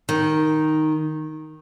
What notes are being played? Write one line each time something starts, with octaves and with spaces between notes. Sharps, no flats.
D#3